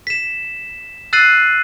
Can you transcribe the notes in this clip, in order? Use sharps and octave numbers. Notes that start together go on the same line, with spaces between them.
B6 E7
E6 F#6 A6 C7 D#7 F#7